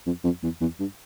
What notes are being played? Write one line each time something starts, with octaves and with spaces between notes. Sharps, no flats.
F2
F2
E2
E2
G2